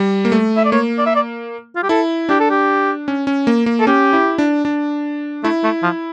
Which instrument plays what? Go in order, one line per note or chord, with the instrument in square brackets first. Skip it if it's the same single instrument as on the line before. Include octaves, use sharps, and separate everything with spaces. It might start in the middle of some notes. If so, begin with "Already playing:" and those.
Already playing: [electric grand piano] G3
A#3
A3
[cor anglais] E5
D5
[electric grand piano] A#3 [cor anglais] C#5
[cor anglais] D5
E5
D5
F4
G4
[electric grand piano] E4 [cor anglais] A4
[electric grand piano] D4 [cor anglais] G4
[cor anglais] A4
G4
[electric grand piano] C#4
C#4
A#3
A#3
[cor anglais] A4
[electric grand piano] C#4 [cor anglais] G4
[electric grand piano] E4
D4
D4
[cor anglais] A3 [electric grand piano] E4
[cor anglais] A3
F3